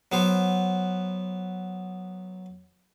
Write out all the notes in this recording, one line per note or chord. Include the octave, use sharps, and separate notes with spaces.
F#3 B3 C5